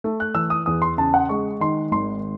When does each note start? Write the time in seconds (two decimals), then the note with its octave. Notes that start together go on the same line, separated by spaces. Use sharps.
0.04 A3
0.20 F#6
0.35 E3 E6
0.50 D#6
0.66 E2 D#6
0.82 C6
0.98 C#3 A5
1.14 F#5
1.29 G#3 C#6
1.60 D#3 C6
1.92 G#1 C6